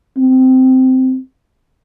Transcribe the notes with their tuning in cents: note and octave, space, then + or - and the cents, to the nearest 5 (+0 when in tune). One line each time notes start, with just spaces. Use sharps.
C4 -15